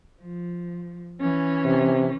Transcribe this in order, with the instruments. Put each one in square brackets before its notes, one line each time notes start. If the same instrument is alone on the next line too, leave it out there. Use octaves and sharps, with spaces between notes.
[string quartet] F3
E3 C#4
[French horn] C3